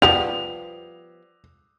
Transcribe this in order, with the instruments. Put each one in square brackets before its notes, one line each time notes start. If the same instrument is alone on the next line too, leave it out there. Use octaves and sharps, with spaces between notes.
[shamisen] F3 G3 B3 [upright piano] F7